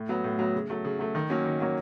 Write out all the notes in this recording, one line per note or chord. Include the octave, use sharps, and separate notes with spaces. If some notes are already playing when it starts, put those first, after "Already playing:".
Already playing: A2
F#3 B3
A2
F#3 B3
C#3
F#3 A3
C#3
F#3 A3
D#3
F#3 A#3 C#4
D#3
F#3 A#3 C#4